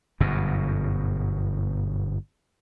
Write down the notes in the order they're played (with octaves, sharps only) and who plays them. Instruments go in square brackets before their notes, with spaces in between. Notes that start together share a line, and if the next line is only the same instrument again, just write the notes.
[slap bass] G1 F#2 B2